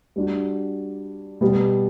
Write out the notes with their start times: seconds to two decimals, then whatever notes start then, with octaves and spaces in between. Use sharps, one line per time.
0.16 G3 D4 F#4
1.41 B2 G3 B3